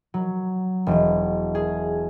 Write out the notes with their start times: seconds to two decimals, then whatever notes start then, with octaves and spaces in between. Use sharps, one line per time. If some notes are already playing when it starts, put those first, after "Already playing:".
0.14 F#3
0.87 E1
1.55 G#4